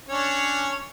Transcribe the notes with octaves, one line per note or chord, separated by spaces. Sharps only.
C#4 D4 C#5